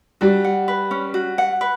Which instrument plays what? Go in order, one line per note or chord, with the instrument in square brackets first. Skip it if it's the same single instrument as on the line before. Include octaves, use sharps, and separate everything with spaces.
[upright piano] G3 [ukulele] F#4
[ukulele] F#5
B4
C#4
F#4
F#5
B4